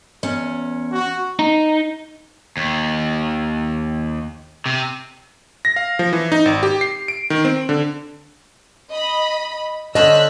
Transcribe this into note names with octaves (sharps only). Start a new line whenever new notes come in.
E2 C#4
F#4
D#4
D#2
C3
A#6
F5
F3
E3
D#4
G#1
G4
C7
D7
D#3
C4
D3
D#5 B5
D3 C#4 C5 D#5 E6 F#6 B6